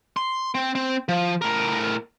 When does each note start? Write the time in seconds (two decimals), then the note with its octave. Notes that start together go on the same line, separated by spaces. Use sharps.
0.17 C6
0.55 C4
0.75 C4
1.09 F3
1.42 A2 A#4